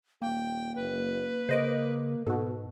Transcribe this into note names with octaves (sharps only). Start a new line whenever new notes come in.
D#1 A#3 G5
F#1 B4
C#3 A#3 C5 D#5 D6
G#2 B2 F#4 A4